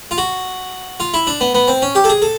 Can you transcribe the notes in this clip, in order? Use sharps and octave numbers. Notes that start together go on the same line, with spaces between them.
F4
F#4
F4
E4
D4
B3
B3
C4
C#4
G4
A4
G#4
A4